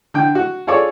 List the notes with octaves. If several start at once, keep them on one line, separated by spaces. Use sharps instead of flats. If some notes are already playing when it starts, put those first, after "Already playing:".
D3 G5
F#4
F4 G#4 A4 C#5 D5